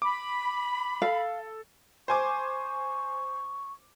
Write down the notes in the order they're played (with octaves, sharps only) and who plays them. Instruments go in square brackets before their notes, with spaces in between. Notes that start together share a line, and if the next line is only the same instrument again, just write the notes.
[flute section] B5 [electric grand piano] D6
[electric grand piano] A4 [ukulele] F5
[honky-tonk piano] C5 G#5 D6 [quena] C#6